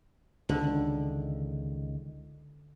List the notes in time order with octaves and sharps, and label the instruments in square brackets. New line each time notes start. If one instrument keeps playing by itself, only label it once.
[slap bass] C#2 D#3 [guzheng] D3